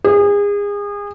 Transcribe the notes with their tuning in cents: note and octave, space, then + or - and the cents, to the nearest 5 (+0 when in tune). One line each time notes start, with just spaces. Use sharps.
G#4 -30